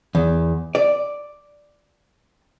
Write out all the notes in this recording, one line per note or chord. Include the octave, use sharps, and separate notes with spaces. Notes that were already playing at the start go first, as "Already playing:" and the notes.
E2
D5